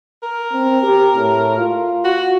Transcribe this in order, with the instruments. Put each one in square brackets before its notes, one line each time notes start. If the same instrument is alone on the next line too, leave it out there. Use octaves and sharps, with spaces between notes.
[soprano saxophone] A#4
[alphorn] C4
G4
A2
F4
[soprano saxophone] F#4